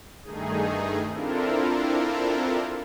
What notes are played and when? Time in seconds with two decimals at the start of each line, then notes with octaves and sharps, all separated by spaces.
0.23 G2 D#3 A3 D#4 G#4
1.10 C4 D4 E4 F4 A4 A#4